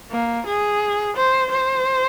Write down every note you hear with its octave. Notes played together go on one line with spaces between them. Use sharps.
A#3
G#4
C5
C5